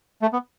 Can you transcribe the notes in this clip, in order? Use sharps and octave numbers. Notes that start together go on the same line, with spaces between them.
A3
B3